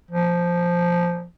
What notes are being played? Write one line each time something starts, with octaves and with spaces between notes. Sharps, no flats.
F3